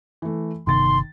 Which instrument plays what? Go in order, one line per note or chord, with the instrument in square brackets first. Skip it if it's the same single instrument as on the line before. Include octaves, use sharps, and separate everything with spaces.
[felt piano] E3 A3
[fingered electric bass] G1 C3 B3 [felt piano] D#3 A6 [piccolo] C6